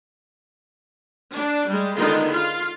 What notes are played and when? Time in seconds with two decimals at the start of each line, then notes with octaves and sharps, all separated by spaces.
1.34 D4
1.67 G3 G#3
1.98 D3 D#3 G#3 B3 D#4 F4
2.31 F4 F5